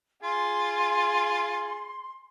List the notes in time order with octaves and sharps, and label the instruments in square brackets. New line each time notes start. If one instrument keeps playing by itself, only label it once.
[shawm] F4 [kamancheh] G#4 [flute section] C6